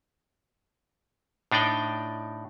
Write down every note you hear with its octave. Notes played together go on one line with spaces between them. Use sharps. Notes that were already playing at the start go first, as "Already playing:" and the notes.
A2 D4 D#4 D5 G5